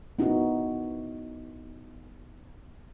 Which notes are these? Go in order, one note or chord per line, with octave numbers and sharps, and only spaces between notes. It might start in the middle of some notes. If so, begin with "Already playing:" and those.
B3 D#4 E4 F#4